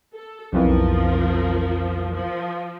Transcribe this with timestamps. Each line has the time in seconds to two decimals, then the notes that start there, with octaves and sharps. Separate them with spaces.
0.14 A4
0.53 B1 F2 E3 F3 A#4
2.13 F3